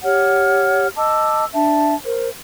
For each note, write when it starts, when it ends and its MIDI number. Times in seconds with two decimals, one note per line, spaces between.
0.03 0.88 67
0.03 0.88 73
0.03 0.88 78
0.03 0.88 89
0.96 1.44 75
0.96 1.44 81
0.96 1.44 86
0.96 1.44 88
1.52 1.94 62
1.52 1.94 76
1.52 1.94 81
2.05 2.28 70
2.05 2.28 72